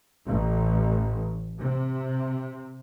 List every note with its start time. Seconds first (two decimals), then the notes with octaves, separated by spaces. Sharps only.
0.27 A1
1.58 C3